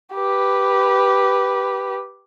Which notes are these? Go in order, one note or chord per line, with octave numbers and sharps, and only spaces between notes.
G4 B4